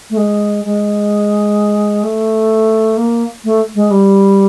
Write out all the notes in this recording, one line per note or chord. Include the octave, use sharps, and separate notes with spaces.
A3
G#3
G#3
A3
A#3
A3
G#3
G3